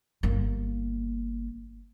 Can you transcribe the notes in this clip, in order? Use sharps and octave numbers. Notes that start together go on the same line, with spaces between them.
G1 A#3